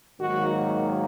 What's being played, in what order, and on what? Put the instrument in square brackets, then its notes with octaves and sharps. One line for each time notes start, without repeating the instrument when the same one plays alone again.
[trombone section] G#2 D#3 F#3 A#3 F#4